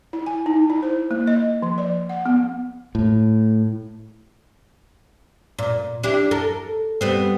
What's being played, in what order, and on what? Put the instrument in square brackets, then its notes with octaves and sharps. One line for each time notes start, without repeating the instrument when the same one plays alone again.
[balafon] E4
G#5
D#4
E4
C5
A#3
D#5
F3
D5
F#5
B3
[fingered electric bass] A2
[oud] A#2
D4 E4 G4
A4 A#4
G3 B3 C4